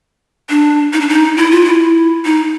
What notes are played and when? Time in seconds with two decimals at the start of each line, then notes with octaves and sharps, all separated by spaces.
0.50 D4
0.93 D#4
1.01 D4
1.09 D#4
1.37 E4
1.51 F4
1.65 E4
2.25 D#4